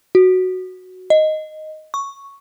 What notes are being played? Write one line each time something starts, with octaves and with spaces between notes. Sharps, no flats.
F#4
D#5
C#6